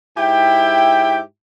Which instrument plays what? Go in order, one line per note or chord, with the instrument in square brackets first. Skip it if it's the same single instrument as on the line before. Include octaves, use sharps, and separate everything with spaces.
[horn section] G#2 E4 G4 E5 G5